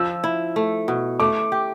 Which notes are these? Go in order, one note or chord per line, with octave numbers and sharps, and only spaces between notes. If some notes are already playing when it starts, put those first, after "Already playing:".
Already playing: F3 E6
E4
A3
B2
A3 D6
G4